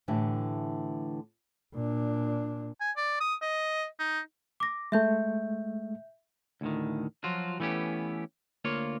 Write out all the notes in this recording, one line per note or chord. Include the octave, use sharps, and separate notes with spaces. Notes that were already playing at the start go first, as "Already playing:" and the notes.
A2 D3 E3 G4
A#2 D4
G#5
D5
D#6
D#5
D#4
D6 A#6
G#3 A3 E5 G6
D2 A2 D#3
F3 F#3 F4 F#4
E3 A3 B3 C#4 G4
D2 A#3 F4 C#5